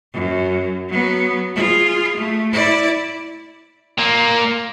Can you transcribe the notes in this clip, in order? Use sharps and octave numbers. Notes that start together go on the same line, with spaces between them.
F#2
F#3 B3
F4 G#4
A3
E4 D5
A#2 A#3